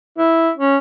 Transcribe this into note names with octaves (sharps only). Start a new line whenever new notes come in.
E4
C#4